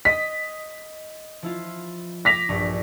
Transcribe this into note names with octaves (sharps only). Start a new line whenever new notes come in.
D#5 D#6 B6
F3 E4 F4
D6 A#6 B6 F7
A#1 G2